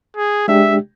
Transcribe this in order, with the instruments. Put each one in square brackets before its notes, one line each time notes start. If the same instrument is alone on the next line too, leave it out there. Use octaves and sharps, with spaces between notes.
[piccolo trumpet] G#4
[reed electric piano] G#3 D4 G4 [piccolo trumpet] E5